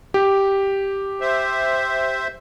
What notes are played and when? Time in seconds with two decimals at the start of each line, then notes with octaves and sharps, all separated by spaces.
0.14 G4
1.21 C5 E5